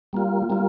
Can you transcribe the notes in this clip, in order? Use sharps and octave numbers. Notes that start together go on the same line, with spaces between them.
G3 A#3 F4
G3 A#3 F4